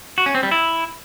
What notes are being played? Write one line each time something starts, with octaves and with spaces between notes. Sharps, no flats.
F#4
C#4
C4
G3
E4